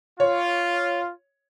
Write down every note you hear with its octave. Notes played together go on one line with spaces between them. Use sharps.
F4 C#5